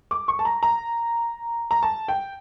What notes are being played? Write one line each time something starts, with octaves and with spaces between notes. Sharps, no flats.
D6
C#6
A5
A#5
A#5
A#5
A5
G5